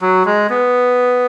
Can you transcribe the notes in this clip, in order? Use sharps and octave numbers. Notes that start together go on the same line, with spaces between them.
F#3
G#3
B3